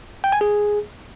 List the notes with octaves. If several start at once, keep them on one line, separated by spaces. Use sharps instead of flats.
G5
G#5
G#4